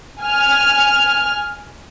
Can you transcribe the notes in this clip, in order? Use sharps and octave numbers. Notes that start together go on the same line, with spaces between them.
G#5 F6